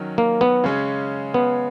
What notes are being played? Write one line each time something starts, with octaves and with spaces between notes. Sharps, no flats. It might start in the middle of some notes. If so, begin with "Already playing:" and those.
Already playing: D#3 F#3 C#4
A#3
B3
C#3 G#3 C#4
B3